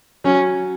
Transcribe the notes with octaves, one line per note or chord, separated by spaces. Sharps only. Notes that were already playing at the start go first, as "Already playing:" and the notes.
F#3 C#4